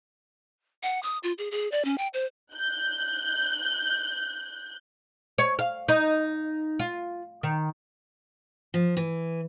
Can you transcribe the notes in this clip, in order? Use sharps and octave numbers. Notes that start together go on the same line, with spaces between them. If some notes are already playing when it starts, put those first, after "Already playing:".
F#5
D#6
F4
G#4
G#4
D5
C#4
G5
C5
F#6 G6
C#5
F5
D#4
F4
D#3
F3
E3